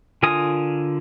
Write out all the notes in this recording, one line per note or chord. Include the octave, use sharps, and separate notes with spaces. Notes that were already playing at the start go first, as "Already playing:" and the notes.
D3 F4 A#4 G#5 D#6